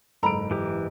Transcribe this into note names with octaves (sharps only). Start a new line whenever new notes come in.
F#1 G#2 A4 A#5 B5 D7
E3 G4